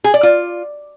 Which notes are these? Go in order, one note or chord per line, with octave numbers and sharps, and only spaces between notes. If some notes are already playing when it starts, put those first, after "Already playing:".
G#4
D5
F4